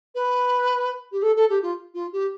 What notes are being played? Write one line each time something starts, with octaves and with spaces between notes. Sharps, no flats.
B4
G4
A4
A4
G4
F4
F4
G4